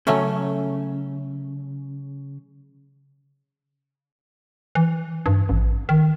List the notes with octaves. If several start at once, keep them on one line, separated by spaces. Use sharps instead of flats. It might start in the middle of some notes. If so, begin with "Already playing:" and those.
C#3 F#3 A3 C#4
E3
G2
A1
D#3